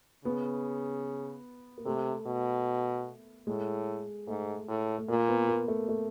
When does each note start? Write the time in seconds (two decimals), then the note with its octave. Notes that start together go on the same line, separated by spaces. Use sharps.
0.24 C#3 B3
1.78 A#3
1.86 C3 A3
2.26 B2
3.47 A2 G#3
4.27 G#2 A3
4.68 A2
4.98 A3
5.08 A#2 A#3
5.29 B3
5.48 A#3
5.68 A3
5.89 A3